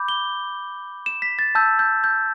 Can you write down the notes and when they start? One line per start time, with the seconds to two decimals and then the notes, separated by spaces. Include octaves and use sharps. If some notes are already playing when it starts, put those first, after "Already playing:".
Already playing: B5 D6 G6
0.08 G7
1.06 E7
1.22 B6
1.39 A6
1.55 A5 E6 G6
1.79 G6
2.04 G6